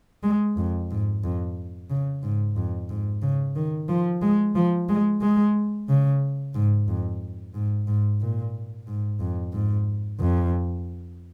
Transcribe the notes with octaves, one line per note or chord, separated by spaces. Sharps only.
G#3
F2
G#2
F2
C#3
G#2
F2
G#2
C#3
D#3
F3
G#3
F3
G#3
G#3
C#3
G#2
F2
G#2
G#2
A#2
G#2
F2
G#2
F2